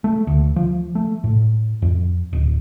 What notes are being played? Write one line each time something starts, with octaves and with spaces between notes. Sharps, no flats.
A3
D2
F3
A3
A2
F2
D1